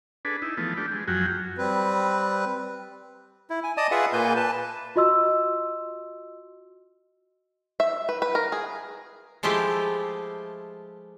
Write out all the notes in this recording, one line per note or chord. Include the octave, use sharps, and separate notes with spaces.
D4 G#4 A4 B4
D#4 E4
E3 F3 A3 B3
A3 D4 G4
G#3
F#2 F3 F#3 F#4 G5 G#5
G3 C4 B4
E4
G#5
D5 D#5 A5 D#6
F4 G#4 B4 E5 F#5
A#2 A#3 B4 G#5 G6
B4 A5
F4 F#4 D#5 C6 E6
E5
B4
B4
A#4
G#4
F3 G#3 A3 E4 F4 G4